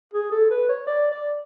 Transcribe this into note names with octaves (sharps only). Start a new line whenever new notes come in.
G#4
A4
B4
C#5
D5
D5